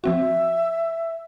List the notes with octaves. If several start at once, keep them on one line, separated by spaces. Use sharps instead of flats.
F3 C4 F#4 E5